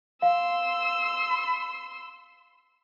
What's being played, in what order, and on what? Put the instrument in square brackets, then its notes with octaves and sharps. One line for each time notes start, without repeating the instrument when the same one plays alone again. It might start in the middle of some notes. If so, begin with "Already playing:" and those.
[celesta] F5 [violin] C6 E6